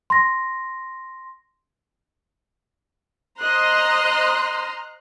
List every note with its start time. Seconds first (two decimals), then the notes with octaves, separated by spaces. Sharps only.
0.10 C6 A#6
3.39 C5 D#5 A#5 C6 F#6